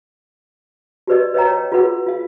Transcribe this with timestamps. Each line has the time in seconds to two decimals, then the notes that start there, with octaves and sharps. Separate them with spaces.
1.07 F#4 G4 B4 D5 D#5
1.34 B4 C#5 D#5 F5 G5 A#5
1.47 C#5 G5
1.72 F4 F#4 G#4 B4 F#5
2.06 F4 F5